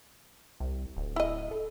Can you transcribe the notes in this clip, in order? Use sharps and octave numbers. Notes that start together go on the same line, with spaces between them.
C2
D1
E4 D#5
A4